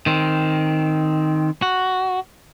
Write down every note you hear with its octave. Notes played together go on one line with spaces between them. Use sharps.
D#3 C4
F#4